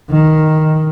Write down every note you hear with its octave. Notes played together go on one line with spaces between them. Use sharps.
D#3